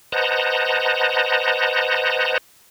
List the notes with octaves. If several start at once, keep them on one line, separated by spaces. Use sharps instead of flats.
B4 C5 D#5 F#5 A5 A#5